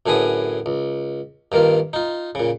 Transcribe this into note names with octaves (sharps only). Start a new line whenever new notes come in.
F#2 A2 D3 G#4 B4 D#6
C#2
G2 D#3 A#3 F4
D#4 F4
A#2 C#3